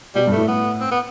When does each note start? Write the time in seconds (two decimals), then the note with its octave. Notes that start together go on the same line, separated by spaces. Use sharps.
0.15 B2 G3
0.27 G2 A3
0.37 A2
0.48 B3
0.80 C4
0.91 B3